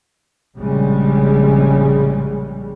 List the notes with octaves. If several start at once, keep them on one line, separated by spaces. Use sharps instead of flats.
A#1 C#3 G3 G#3